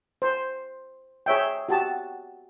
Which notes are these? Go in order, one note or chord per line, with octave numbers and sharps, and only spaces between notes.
C5
G#4 C#5 E5 G5
F#4 G4 A5